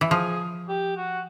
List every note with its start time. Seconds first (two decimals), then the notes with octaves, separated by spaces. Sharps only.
0.01 E3
0.10 F3 G#4
0.69 G4
0.97 F#4